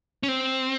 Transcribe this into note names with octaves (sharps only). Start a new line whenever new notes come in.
C#4
C4